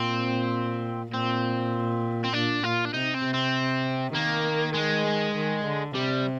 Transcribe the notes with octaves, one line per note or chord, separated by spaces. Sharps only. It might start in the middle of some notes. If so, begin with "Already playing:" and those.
Already playing: A#2 C4
A#2 C4
C4
A#2 D4
A#2 F4
D4
C3 D#4
C4
C3
C4
D#3 A#3
G#3
D#3
D3
C3 G3